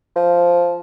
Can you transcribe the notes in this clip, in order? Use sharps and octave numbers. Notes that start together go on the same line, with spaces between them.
F3